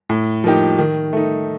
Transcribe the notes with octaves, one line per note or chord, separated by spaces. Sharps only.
A2
F3 A#3 D#4 G4
D#3
A3 D#4